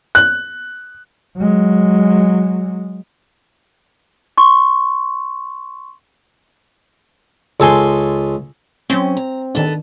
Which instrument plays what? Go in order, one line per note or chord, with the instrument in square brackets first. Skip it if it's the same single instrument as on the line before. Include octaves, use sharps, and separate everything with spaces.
[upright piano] F#6
[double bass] F#3 G#3
[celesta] C6 C#6
[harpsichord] C#2 A4 G#5 C6
[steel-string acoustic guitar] F#3 C#4 [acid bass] C4
[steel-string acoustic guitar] A#5
[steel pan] D#3 D4 [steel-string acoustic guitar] B3 A4